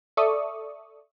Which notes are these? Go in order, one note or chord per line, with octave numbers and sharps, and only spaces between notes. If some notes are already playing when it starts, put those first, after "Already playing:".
A4 D5 E5 C#6 D#6